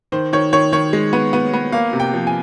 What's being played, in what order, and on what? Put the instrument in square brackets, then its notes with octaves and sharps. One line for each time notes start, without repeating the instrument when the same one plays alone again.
[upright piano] D#3 C5
D#3 C#5
D#3 C#5
D#3 C#5
G#3
B3
B3
B3
A#3 F5
C3
G5
F3
G#5